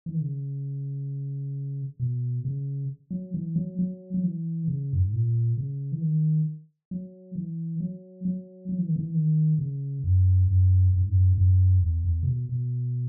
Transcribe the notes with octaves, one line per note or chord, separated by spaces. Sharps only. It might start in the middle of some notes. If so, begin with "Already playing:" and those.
E3
D#3
C#3
B2
C#3
F#3
E3
F#3
F#3
F#3
E3
C#3
F#2
G#2
A#2
C#3
E3
D#3
F#3
E3
F#3
F#3
F#3
E3
D#3
E3
D#3
C#3
F#2
F#2
F#2
G#2
F#2
G#2
F#2
E2
E2
C#3
B2
B2